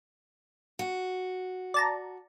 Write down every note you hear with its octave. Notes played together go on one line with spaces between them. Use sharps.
F#4
D5 A5 A#5